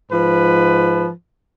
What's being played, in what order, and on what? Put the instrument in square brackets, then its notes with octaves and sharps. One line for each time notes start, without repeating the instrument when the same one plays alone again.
[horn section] G#2 F3 B4